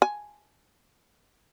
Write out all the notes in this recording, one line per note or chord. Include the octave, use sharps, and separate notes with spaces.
G#5